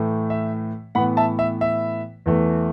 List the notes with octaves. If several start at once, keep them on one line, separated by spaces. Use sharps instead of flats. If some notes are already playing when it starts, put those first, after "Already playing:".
Already playing: A2 E3 A3
E5
A2 E3 B3 F#5 B5
E5 A5
E5
E5
E2 E3 A3